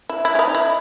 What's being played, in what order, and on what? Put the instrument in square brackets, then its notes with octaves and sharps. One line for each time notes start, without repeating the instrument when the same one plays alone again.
[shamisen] E4
E4
C#4
D#4
E4